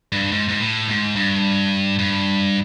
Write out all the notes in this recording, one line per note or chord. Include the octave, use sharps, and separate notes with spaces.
G2
G#2
G#2
A2
G#2
G2
G2